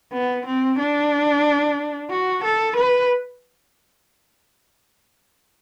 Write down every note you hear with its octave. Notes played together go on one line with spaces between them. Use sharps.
B3
C4
D4
F#4
A4
B4